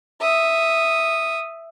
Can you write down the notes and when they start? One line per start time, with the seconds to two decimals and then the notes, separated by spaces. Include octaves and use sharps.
0.21 E5 D#6